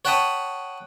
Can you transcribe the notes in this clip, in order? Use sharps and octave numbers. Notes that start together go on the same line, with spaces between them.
C#5 F#5 G5 A5 B5 D#6